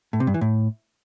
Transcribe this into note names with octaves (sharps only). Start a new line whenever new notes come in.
A2
C3
G2
E3
A2